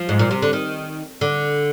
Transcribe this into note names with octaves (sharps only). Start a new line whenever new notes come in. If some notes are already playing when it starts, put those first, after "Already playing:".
Already playing: F3
G#2
A#2
C3
D3
D#3
D3